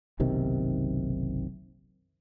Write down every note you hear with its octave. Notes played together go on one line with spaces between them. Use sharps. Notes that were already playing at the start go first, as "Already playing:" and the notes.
F#1 B1 C3 D#3